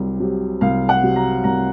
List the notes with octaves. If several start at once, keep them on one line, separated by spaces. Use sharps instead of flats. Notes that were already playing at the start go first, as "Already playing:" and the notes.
Already playing: C2 C3 F#3
C3 F#3
C2 F5
F#5
C3 F#3
A#5
C2 A#5